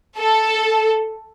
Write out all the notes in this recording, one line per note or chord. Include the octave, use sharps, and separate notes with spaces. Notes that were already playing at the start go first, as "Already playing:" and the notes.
A4